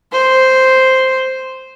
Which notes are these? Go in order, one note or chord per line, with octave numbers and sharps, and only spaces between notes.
C5